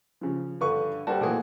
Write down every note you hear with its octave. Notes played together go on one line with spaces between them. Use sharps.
C#3 F3
G2 D3 B4 C#6
G3 F#4 A4 C5 G5 A5
A#2 E3 A3 F#4 G#4